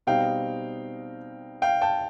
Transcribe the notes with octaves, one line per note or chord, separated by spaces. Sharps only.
B2 G3 C4 D#4 F5 G5
F5 G5
G5 A5